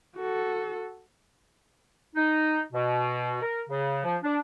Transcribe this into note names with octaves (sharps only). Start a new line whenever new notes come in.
F#4 A4
D#4
B2
A#4
C#3
F3
D4